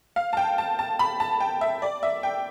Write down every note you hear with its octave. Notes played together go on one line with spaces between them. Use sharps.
F5
A5
G5
A5
A5
B5
A5
G5
E5
D5
E5
G5